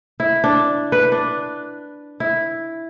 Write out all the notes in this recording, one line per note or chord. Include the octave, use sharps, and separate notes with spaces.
E4
D4
B4
D4
E4